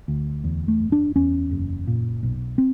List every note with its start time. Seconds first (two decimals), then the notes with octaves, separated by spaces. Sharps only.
0.08 D2
0.44 E2
0.68 A3
0.80 F#1
0.92 D4
1.16 E2 C#4
1.51 F#1
1.87 A#2
2.23 B1
2.58 C4